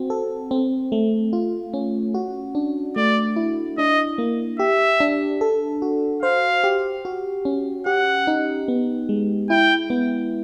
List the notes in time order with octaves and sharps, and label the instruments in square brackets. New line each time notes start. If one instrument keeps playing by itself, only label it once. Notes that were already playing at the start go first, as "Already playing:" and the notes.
Already playing: [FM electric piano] C4 F#4
A4
C4
A3
F4
C#4
F#4
D4
[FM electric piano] A3 [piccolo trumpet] D5
[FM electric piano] E4
[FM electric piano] D4 [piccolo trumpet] D#5
[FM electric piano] A#3
[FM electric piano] G4 [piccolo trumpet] E5
[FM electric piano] D4
A4
F#4
[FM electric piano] C5 [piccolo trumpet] F5
[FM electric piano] G4
F#4
C#4
[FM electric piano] G4 [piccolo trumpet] F#5
[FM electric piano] D#4
B3
G#3
[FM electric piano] E4 [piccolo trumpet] G5
[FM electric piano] B3